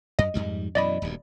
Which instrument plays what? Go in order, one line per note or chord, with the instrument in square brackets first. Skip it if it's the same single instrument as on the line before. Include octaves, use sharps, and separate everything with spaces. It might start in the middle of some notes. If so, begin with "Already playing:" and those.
[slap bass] F#2 [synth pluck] D#5
[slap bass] F2 G#2 G3
[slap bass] F#2 B2 E3 [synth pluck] D5 D#5 B5
[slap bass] D#1 D2 G2